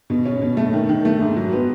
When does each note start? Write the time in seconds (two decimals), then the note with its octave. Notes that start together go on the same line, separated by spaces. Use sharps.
0.10 B2
0.26 C#4
0.42 B2
0.57 A3
0.73 D#3
0.89 D#3
1.05 A3
1.20 G#2
1.36 F#3
1.53 B3